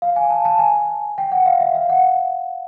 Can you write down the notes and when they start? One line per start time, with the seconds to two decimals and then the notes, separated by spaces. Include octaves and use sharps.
0.02 F5
0.16 G#5
0.31 A5
0.45 A5
0.59 G#5
1.18 G5
1.32 F#5
1.46 F5
1.60 E5
1.75 F5
1.89 F#5